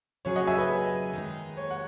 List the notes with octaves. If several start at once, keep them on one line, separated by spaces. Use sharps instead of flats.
C#3 F#3 C#4 G#4 C#5
D#5 F#5
E5 G#5
B4
D#3 G#3 D#4
C#5
F#5